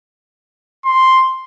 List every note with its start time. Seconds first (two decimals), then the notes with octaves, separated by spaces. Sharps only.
0.85 C6